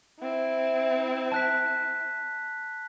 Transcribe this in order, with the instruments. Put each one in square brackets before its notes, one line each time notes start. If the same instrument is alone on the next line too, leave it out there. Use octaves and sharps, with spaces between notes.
[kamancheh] C4 E4
[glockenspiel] A5 F#6 B6